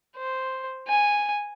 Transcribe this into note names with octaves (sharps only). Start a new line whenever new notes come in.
C5
G#5